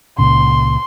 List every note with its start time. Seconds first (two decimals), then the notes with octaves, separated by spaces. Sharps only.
0.18 C#2 A#2 C#3 C6